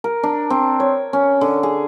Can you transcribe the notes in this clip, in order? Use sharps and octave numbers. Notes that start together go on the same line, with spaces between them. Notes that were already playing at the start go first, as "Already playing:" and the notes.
A#4
D4
C4
C#5
C#4
D3
G#4